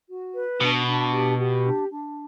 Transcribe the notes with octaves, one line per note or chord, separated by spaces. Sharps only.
F#4
B4
B2 D4
D4
G4
G4
D4
D4